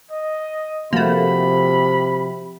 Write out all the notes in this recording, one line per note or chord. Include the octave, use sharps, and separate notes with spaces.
D#5
C3 F3 A3 A#3 F4 F#4 B5